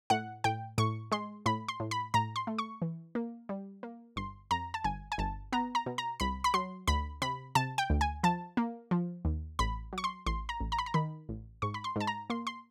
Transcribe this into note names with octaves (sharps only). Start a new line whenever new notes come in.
A2 F#5
A2 G5
A2 C#6
G#3 C6
A2 B5
C6
A2
B5
A2 A#5
C6
A3
C#6
E3
A#3
G3
A#3
G1 C6
F2 A#5
A5
G1 G#5
G#5
G1 A5
B3 A#5
A#5
B2
A#5
C2 B5
B5
F#3 C6
D2 B5
C3 B5
C3 A5
G5
D2
G#5
F3 A5
A#3
F3
D#2
A1 B5
F#3
C#6
C6
A1 C6
A#5
A1
A#5
B5
A#5
D#3 B5
A1
G#2 C#6
B5
C6
G#2 A5
A#5
A#3 C6
C6